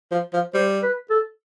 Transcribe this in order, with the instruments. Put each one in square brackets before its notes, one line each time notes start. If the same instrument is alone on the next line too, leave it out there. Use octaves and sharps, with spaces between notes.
[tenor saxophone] F3
F3
[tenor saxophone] G3 [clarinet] C5
[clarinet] B4
A4